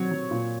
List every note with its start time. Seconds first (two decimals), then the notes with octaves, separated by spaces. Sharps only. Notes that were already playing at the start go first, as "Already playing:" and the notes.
Already playing: F#3 C4 C#5
0.12 F#3
0.31 A#2